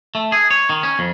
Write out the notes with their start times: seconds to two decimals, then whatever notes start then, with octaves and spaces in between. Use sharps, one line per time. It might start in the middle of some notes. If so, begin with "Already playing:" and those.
0.15 A3
0.32 G#4
0.51 C#5
0.69 D#3
0.83 C#4
0.99 F2